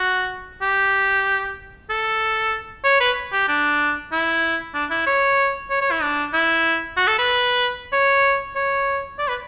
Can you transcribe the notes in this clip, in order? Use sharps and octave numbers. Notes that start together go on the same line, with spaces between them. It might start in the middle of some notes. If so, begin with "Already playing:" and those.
Already playing: F#4
G4
A4
C#5
B4
G4
D4
E4
D4
E4
C#5
C#5
C#5
E4
D4
E4
F#4
A4
B4
C#5
C#5
D5
B4